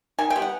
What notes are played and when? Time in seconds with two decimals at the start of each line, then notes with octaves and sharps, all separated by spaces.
0.19 D#3 G#5
0.30 G5
0.36 G3 B3
0.42 F#5